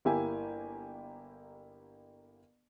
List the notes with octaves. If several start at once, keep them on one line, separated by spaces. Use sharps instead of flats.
G1 A#3 E4 G4 G#5